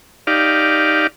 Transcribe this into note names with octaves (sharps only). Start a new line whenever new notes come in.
D#4 G4 D5 F5